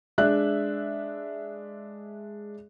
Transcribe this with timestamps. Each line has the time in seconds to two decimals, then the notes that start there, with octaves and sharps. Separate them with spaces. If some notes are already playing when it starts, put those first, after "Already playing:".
0.18 G#3 D4 E5 F#6